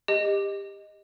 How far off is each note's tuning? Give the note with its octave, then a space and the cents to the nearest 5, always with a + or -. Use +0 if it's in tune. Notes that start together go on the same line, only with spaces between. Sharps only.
G4 +20 D#5 +0